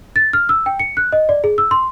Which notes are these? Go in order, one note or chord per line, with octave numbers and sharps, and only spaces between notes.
A6
F6
E6
G5
C#7
F#6
D#5
D5
G#4
E6
C6